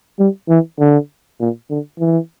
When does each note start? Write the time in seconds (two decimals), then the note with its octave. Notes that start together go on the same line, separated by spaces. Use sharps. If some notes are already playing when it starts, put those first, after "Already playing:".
0.19 G3
0.49 E3
0.79 D3
1.40 A#2
1.70 D3
2.00 E3